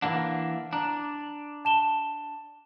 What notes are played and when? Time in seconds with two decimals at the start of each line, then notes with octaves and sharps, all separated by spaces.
0.02 E3 A#3 D4 F#5
0.73 D4 A#5
1.65 A5 E7 G7